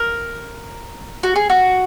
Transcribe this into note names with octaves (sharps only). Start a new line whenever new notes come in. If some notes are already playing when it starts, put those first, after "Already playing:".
Already playing: A#4
F#4
G#4
F#4